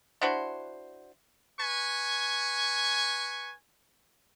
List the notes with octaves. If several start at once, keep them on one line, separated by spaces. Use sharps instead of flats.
D4 E4 F#4 C5
B4 G#5 C#6